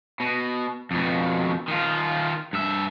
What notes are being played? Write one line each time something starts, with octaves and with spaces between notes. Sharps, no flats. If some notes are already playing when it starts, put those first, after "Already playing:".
B2
F2 B2
D#3 F4
G2 E5